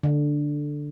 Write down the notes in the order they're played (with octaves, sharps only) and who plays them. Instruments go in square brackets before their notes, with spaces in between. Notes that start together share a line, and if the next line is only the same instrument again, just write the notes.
[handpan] D3